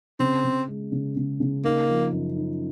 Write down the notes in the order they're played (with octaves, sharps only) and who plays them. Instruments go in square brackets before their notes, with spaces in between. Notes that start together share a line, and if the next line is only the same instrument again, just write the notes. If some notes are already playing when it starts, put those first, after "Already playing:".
[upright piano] C#3 [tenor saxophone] C4
[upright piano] C#3
G#3
C#3
C#3
C#3
[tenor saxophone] A#3 [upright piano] D#4
[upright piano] F3
F#2
D#4